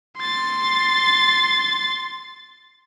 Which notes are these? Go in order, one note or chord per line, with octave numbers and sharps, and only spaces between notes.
C6 A6